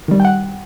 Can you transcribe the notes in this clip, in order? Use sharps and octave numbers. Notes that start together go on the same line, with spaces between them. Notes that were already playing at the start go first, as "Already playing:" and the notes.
D#3 G3
G5
F#5